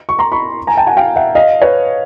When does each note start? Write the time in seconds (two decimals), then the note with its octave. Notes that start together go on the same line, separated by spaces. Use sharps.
0.09 C#6
0.19 A#5 C6
0.32 B5 C#6
0.67 G#5 A#5
0.77 G5 A5
0.87 F#5 G#5
0.97 F5 G5
1.16 E5 F#5
1.35 D#5 F5
1.62 B4 C#5